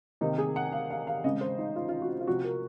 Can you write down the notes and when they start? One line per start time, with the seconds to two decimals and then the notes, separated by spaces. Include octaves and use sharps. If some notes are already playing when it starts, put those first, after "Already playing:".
0.21 C3 D#3 A#3 D#4
0.38 G#4
0.56 F#5
0.72 F5
0.90 F5
1.07 F5
1.24 C#3 G#3 C4 D#5
1.41 C5
1.59 D#4
1.76 F4
1.89 F4
2.02 F#4
2.20 F4
2.27 C3 F3 C4 F#4
2.44 A#4